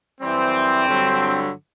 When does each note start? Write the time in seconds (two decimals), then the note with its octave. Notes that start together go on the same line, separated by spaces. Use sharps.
0.21 F#2 E3 G3 C4
0.88 G2 D3 F#3